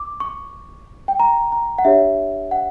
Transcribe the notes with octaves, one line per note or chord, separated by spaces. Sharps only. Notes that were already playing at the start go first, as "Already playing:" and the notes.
Already playing: D6
C#6
G5
A#5
A#5
F#5
D4 G4 C#5 E5
F#5